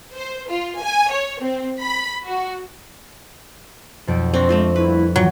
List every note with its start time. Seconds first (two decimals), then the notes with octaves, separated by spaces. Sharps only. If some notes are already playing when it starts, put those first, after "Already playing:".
0.14 C5
0.49 F4
0.80 G#5
1.10 C#5
1.41 C4
1.81 B5
2.27 F#4
4.07 B1 F2 D7
4.34 C4 D4 C#6 A#6
4.49 G#3 A3 C4 F4
4.76 G3 A#3 E4 B4
5.16 G#2 D#3 E3 F#3 F4 G5